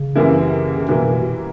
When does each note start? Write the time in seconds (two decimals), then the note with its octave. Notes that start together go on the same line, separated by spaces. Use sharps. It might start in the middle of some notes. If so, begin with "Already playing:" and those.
Already playing: C#3
0.15 F#2 E3 G3 A#3 E4
0.88 F#2 B2 E3 G3 A#3 E4